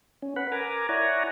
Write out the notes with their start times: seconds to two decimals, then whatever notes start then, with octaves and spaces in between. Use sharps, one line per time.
0.22 C#4
0.36 B4 F#5 B5
0.52 A#4 G#5 A#5 D6
0.89 E4 C#5 D5 F#5 G#5 A#5